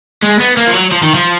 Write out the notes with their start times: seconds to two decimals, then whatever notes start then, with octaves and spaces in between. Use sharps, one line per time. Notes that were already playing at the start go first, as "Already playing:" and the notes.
0.22 G#3
0.40 B3
0.57 A#3
0.67 F3
0.74 F#3
0.92 F3
1.03 D#3
1.15 F3